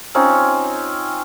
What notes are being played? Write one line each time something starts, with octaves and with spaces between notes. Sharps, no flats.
C4 C#4 D#4 F4